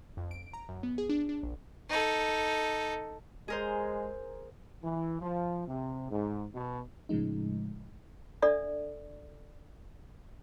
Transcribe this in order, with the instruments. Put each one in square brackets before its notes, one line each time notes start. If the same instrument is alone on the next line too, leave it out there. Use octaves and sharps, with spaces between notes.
[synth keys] F2
D7
A#5
F#2
B3
G#4
D4
D4
A#1
[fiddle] D#4 A4
[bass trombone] G#3 [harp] G#4 A#4 C5
[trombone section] E3
F3
C3
G#2
B2
[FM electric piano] A2 C#3 F3 G#3 D#4
[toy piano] D4 A4 D5 E5